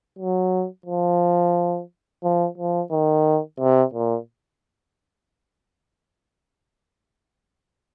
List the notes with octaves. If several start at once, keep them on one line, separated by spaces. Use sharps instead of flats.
F#3
F3
F3
F3
D#3
C3
A#2